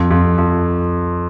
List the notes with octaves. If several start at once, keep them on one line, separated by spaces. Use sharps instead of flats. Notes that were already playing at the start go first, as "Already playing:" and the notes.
Already playing: F2
F2
F2